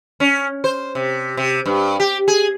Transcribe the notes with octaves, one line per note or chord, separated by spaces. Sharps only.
C#4
C5
C3
C3
G2
G4
G#4